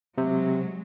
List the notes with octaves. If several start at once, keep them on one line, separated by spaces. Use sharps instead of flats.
C3 F#3 G#3